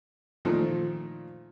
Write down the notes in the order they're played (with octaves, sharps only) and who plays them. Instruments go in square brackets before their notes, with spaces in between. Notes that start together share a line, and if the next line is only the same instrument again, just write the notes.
[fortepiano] A#2 D#3 F3 A3